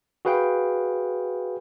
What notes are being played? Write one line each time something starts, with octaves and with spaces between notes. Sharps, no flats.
F#4 G#4 B4 F5 G5